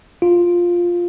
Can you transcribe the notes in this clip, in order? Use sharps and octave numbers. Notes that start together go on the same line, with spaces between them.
F4